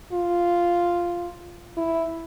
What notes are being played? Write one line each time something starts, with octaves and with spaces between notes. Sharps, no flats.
F4
E4